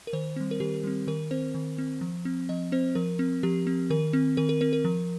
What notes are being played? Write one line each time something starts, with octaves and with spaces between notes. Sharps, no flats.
A#4
D#3 C5
G3 C4
A#4
D#3 G4
G3 C4
D#3 A#4
C4 C5
D#3
C4
F3
C4
F3 D#5
C4 C5
F3 A#4
C4
F3 G4
C4
D#3 A#4
C4
D#3 A#4
A#4
C4 A#4
A#4
F3